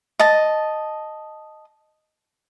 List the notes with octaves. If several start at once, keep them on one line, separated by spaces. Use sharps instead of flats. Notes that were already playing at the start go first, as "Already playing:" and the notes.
D#5 A5